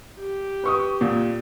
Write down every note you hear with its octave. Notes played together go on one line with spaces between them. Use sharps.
G4
B4 C#6 D#6
A#2